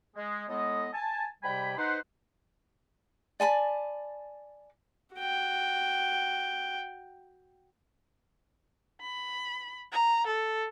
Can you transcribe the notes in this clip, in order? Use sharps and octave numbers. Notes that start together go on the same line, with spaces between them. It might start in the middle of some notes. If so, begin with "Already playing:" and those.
G#3
A2 G#3 B3 A4 D#5
G#5 A5
G#2 C3 G3 G5 G#5 B5
D#4 B4 C5 F#5
D5 G#5 A5 B5
F#4 G5
B5
A#5
A4